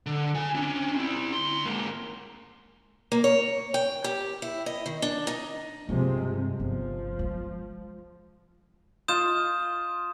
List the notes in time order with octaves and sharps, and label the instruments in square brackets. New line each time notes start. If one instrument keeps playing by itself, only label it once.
[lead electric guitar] D3
C#3 G#5
C#4 D4
C4 E4
D2 C6
G#2 A#3
[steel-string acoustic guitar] A#3
C#5
G5
G4
E4
D#5
D#3
D4
D#4
[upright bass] G2 [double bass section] C3 F3 G#3
[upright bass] G1 [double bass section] F3
[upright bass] G#3
[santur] F4 D#5 [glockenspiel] D#6 G6 E7